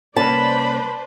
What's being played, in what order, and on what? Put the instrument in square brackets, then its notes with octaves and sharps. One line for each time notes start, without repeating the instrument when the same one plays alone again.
[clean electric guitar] C2 A#3 C#4 [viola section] B4 C5 D5 [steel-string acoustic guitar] A5 [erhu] B5